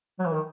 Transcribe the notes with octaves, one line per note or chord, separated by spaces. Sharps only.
F#3
E3
D#3